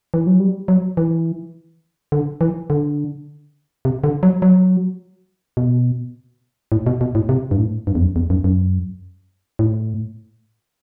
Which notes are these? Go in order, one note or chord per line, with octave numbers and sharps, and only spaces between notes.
E3
F#3
G3
F#3
E3
D3
E3
D3
C3
D3
F#3
F#3
B2
A2
B2
B2
A2
C3
G2
A2
G2
E2
F#2
E2
F#2
F#2
A2